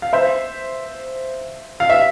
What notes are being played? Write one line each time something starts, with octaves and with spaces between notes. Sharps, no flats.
F5
C5 E5
F5
E5